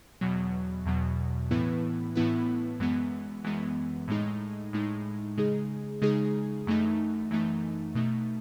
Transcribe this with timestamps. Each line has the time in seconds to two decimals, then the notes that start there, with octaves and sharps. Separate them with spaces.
0.21 E2 B2 F#3
0.86 E2 B2 F#3
1.51 A2 E3 B3 E4 B4
2.15 A2 E3 B3 E4 B4
2.80 F#2 E3 G#3 B3
3.44 F#2 E3 G#3 B3
4.08 A2 G#3 D#4
4.73 A2 G#3 D#4
5.38 C#3 G#3 D#4 G#4
6.02 C#3 G#3 D#4 G#4
6.66 F#2 E3 A3 D#4
7.31 F#2 E3 A3 D#4
7.95 B2 A3 D#4